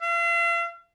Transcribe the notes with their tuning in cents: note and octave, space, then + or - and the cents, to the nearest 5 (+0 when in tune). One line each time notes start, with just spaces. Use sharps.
F5 -45